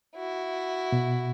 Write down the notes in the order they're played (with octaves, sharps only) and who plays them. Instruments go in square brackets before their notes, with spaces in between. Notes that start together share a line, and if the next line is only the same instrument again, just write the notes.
[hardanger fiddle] E4 F#4
[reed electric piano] B2